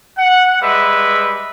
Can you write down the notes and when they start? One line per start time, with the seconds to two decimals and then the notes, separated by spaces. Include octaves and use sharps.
0.18 F#5
0.61 G3 G#3 B4 E5